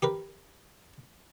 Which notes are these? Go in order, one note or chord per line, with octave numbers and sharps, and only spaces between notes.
G4 A#4 B4